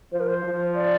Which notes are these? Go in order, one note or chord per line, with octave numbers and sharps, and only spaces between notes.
F3 C5
A#4
C5
F3
D5